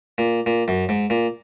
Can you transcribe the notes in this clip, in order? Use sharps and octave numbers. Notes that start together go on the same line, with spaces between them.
A#2
A#2
F#2
G#2
A#2